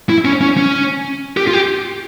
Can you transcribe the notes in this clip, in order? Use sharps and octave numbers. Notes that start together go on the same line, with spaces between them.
E4
C#4
C#4
C#4
G4
F4
G4